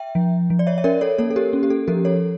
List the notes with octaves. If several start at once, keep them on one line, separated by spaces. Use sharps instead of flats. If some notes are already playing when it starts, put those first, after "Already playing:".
Already playing: E5 G5
F3
F3
D5
C#5 E5
E5
C#4 A#4 D5
A4 C#5
A#3 A4 C#5
A4
G4 A#4
C#4
G4
A4
F3 G4 A#4
A4 C#5